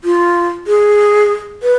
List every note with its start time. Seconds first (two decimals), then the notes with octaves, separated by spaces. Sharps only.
0.04 F4
0.67 G#4
1.63 B4